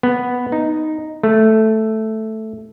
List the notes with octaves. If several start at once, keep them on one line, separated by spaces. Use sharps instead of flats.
B3
D#4
A3